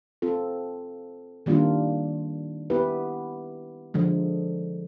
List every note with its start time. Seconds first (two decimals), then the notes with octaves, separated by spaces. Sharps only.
0.22 C4 F4 A4
1.46 D#3 G3 A#3 D4 F4
2.70 B3 E4 G4 B4
3.94 D3 F3 G#3